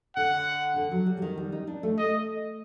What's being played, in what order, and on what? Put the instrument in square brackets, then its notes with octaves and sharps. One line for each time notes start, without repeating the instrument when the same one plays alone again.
[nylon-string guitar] D3 [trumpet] F#5
[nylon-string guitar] D3
F#3
G3
F#3
D#3
G3
D#4
D4
A3
[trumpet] D#5